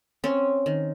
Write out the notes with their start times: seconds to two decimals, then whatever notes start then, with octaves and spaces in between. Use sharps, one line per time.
0.24 C4 C#4
0.66 D#3